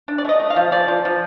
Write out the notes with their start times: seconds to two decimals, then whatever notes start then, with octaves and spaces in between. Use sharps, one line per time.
0.08 D4
0.18 D5
0.25 A3
0.29 D#5
0.40 A3
0.50 F5
0.56 F3
0.72 F3 D5
0.88 F3
1.05 F3